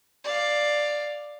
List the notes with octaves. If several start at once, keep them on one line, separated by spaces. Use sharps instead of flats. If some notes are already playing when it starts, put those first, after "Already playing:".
D5 F5